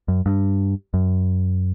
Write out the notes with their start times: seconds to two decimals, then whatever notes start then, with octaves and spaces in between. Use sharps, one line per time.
0.08 F#2
0.26 G2
0.94 F#2